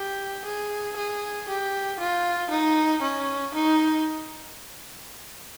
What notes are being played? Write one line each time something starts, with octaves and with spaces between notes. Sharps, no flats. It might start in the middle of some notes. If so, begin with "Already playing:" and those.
Already playing: G4
G#4
G#4
G4
F4
D#4
C#4
D#4